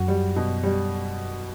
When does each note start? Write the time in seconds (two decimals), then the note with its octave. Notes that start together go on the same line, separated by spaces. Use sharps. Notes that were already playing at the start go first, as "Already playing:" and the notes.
Already playing: F#2 F#4
0.08 G3
0.36 B2
0.63 G3